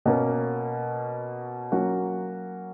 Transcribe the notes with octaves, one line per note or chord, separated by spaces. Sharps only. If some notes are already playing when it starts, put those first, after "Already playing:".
B2 A#3 C#4
F#3 A#3 C#4 F#4